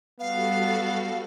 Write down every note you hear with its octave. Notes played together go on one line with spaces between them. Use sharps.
G3 B3 F#4 A4 F5